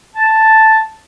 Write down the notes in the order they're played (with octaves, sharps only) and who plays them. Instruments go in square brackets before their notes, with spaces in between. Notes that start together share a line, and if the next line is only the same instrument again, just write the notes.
[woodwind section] A5